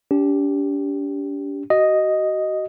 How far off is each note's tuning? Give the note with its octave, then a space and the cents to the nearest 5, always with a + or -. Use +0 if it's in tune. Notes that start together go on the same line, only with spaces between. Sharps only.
D4 -45 G4 +0
F#4 +30 D#5 +0